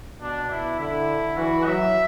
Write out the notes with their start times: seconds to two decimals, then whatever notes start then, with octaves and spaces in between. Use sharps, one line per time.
0.21 B2 D4
0.50 E4
0.79 D3 E4
1.37 E3 F#4
1.65 F#3 E5